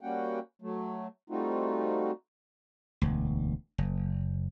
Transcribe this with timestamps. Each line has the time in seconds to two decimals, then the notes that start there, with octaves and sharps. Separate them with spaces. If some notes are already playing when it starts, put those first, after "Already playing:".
0.01 G3 A#3 C#4 F#4 F#5 G5
0.62 F#3 A3
1.30 G3 A3 C4 D#4 F4 F#4
3.02 E1 D2
3.78 F#1